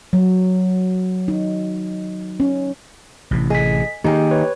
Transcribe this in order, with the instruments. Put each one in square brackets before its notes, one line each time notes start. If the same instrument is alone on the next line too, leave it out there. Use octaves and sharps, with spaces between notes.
[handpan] F#3
D#4
C#4
[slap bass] A1 C3
[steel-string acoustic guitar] G#4 [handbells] D#5 B6
[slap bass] D#3 A#3 [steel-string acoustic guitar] D#4 G#4 [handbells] G4 G5
[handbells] B4 C#5